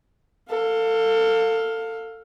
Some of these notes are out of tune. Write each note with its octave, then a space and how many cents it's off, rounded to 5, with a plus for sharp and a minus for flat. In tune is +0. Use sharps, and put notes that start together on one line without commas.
A4 +30 F5 +15